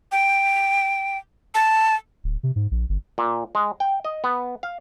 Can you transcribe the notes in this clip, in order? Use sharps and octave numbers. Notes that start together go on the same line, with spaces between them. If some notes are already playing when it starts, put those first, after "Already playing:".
G5
A5
D1
C3
G#2
A#1
G1
A#2
G#3
G5
D#5
B3
F5